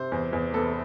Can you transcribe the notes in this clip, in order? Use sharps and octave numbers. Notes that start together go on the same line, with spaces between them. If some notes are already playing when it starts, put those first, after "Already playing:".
Already playing: C3 C5
E2
E2
B3 A4